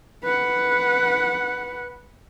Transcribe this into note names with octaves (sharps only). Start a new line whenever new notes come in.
B4 F#5